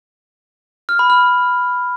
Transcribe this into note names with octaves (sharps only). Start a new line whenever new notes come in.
F6
B5
F6